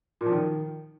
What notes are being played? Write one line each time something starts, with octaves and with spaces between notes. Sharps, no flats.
A#2
F3
D#3